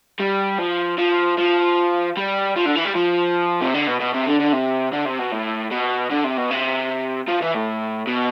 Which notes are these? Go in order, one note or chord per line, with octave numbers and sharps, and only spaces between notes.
G3
F3
F3
F3
G3
F3
D3
E3
G3
F3
C3
D3
B2
B2
C3
D3
D3
C3
D3
C3
B2
A2
B2
D3
C3
B2
C3
F3
E3
A2
B2